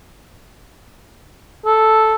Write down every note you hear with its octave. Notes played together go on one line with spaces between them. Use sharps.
A4